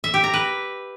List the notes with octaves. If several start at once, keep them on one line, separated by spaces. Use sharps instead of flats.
E5
G4
A#5
B4